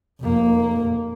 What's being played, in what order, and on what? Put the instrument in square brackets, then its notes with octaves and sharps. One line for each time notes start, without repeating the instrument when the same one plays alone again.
[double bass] F1 A#3